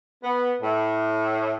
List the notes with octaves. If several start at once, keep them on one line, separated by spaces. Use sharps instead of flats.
B3
A2